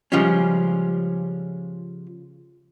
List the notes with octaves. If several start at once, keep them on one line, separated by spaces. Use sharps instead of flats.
C#3 F3 G3 G#3 C#4